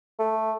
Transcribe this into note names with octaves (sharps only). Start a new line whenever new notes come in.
A3